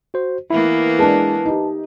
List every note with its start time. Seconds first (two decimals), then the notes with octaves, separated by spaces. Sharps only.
0.14 F#4 C5
0.50 E3 A#3 B3 E4
0.99 G#3 D4 B4 A5
1.46 D#4 G4